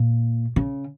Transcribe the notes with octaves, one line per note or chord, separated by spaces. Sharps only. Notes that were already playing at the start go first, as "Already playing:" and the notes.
Already playing: A#2
C#3